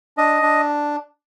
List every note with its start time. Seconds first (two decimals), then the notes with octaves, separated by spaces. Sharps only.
0.17 D4 D#5
0.42 D4